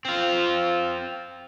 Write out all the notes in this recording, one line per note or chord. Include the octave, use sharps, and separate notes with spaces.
C4 F4